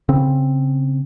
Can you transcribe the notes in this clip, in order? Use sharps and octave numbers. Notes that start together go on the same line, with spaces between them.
C#3 C4